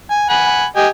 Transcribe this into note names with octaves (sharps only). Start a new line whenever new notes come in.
G#5
F#5 G#5 B5
G4 D#5 G#5